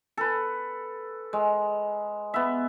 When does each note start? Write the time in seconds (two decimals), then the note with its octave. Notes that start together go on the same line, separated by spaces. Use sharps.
0.17 A4 B4
1.33 G#3
2.34 B3 E5